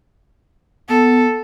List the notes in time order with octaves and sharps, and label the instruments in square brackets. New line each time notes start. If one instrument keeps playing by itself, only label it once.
[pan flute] B3 [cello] A4